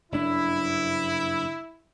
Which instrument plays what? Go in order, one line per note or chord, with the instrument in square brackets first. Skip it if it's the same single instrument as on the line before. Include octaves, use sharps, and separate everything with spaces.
[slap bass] F#1 G2 D4 [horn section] E4